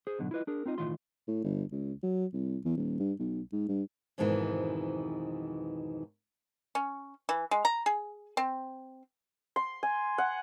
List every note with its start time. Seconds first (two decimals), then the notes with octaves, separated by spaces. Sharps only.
0.07 G#4 C5
0.19 G#2 B2 D3 F#3
0.31 E4 F4 B4 D#5
0.47 D4 G#4 A#4
0.66 C4 D#4 F4 D#5
0.78 B1 A2 D#3 E3 F4 C6
1.27 A2
1.44 G1
1.71 C#2
2.03 F#3
2.33 C2
2.65 E2
2.77 D#1
3.00 G2
3.19 B1
3.52 G#2
3.68 G2
4.18 F2 G#2 B2 D#3 E3
6.75 C#4
7.29 E3
7.51 G#3
7.65 A#5
7.86 G#4
8.37 C4
9.56 C6
9.83 G#5
10.18 F#5